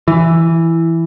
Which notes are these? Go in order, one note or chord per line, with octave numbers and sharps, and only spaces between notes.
E3